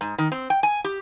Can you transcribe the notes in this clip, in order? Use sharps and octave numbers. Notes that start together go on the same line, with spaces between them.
G#2
D#3
C4
G5
G#5
G4